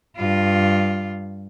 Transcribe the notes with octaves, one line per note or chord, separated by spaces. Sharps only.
G2 F4